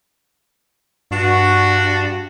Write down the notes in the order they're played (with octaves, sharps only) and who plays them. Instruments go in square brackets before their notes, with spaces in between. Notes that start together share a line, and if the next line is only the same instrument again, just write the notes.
[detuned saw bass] G2 [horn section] D4 F#4